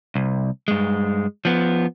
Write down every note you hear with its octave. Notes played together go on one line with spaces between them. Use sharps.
C2
G2 G#3
F3 B3